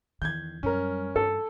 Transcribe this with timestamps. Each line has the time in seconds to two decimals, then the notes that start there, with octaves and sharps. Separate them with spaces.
0.22 E2 D#3 G6 G#6
0.63 F#2 G3 C#4 A#4
1.16 G2 A4